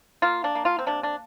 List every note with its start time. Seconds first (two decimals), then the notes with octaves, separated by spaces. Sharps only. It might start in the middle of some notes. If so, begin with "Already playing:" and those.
0.22 A#3 F4
0.44 D4
0.55 A#3
0.65 F4
0.79 C4
0.86 C3 D4
1.03 D4